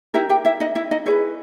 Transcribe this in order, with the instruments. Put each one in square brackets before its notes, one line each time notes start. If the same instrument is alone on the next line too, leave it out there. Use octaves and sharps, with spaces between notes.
[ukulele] D#4 E4 G4 A#4 E5
G4 G5
E4 E5
D#4 D#5
E4 E5
D#4 D#5
E4 G#4 B4 C#5